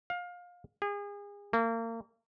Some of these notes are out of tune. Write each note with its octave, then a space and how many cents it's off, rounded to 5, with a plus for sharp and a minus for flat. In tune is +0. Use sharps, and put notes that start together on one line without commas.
F5 +25
G#4 -35
A#3 -35